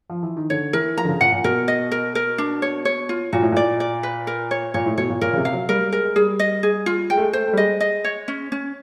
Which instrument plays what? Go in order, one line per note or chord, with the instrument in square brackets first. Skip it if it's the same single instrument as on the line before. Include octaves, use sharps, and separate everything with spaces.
[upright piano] F3
E3
D#3
[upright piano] D3 [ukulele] C#5
[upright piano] E3 [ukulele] A#4
[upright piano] F3 [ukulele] A#5
[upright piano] D3
C#3
[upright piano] A#2 [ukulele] F#5
[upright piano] A#2
[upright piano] B2 [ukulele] A#4
[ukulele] D#5
A#4
A#4
D4
C#5
C#5
F4
[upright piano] A#2 [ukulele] F#4
[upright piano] A2
[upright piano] A#2 [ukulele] D5
[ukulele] D5
B4
A#4
C#5
[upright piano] A#2 [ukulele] C#5
[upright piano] A2
[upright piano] B2 [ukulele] C#5
[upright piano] A#2
[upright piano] A#2 [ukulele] A#4
[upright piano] C#3
C3
[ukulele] F5
[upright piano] F#3
[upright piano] G3 [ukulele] A#4
[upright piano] G3
[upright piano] G#3 [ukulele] A#4
[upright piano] G#3
[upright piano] G3 [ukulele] G#4
[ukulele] D#5
G#4
F4
[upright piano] G#3 [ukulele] G5
[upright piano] A3
G#3
[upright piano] A3 [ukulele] C5
[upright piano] A3
G3
[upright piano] G#3 [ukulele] D#5
[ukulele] D#5
C#5
C#4
C#4